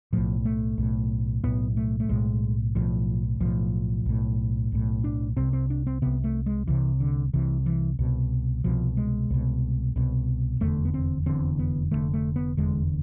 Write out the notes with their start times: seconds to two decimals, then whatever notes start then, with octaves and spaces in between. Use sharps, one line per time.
0.13 B1 A2 F3
0.45 A3
0.78 B1 A2
1.44 B1 A2 B3
1.77 A3
2.00 A3
2.09 B1 A2 G#3
2.75 B1 A2 F3
3.40 B1 A2 F3
4.06 B1 A2
4.72 B1 A2
5.04 D4
5.37 C2 C3 C4
5.53 C4
5.70 D4
5.87 C4
6.02 C2 C3 B3
6.24 A3
6.46 G#3
6.68 C2 C3 E3
7.00 D3
7.33 C2 C3 E3
7.66 E3
7.99 C2 B2
8.64 C2 B2 F3
8.97 G#3
9.30 C2 B2
9.96 C2 B2
10.60 F1 E2 D3 A3
10.85 B3
10.94 C4
11.26 F1 E2 D3 C4
11.59 B3
11.91 F1 E2 D3 A3
12.14 A3
12.36 B3
12.57 F1 E2 D3 G#3